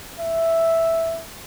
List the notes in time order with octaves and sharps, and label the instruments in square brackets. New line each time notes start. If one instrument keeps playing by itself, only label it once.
[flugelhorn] E5